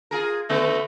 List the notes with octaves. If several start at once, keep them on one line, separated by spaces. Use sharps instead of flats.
F4 G#4 A#4
D3 A3 B3